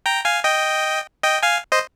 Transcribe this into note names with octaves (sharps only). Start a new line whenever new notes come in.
G5 A#5
F5 G#5
D#5 G5
D#5 G5
F5 G#5
C5 D#5